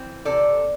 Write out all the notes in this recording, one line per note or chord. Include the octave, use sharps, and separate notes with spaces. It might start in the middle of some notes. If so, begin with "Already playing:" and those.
Already playing: E3 C4
C3 A4 D5